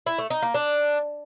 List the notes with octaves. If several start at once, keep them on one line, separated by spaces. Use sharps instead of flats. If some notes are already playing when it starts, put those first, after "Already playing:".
E4
A3
D#4
A#3
D4